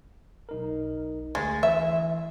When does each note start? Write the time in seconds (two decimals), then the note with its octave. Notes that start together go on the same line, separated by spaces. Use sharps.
0.49 B1 D#4 A#4
1.35 D2 G#3 A6
1.63 E3 E5